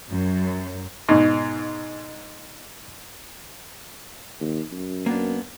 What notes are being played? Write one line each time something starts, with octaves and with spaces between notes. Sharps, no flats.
F#2
G#2 B2
D#2
F#2
A#3 B3 D4